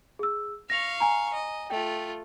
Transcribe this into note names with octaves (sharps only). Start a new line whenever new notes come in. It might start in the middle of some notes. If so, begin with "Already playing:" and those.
G#4 E6
F5 C#6 A#6 F7
G#5 A#5
D#5
A3 F4 G5